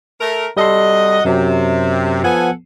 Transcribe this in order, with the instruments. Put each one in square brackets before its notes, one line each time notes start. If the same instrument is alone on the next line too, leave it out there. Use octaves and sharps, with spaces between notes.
[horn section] A3 A#4
[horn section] C3 F#4 D#5 [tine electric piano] G3 A4 C6
[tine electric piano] F#2 F#3 [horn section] C3
[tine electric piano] F3 B3 [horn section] A4 F#5 G#5